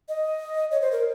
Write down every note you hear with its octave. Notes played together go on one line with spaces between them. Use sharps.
D#5
C#5
C5
A#4